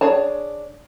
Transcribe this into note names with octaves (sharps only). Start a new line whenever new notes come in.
D4 G#4 C#5 A5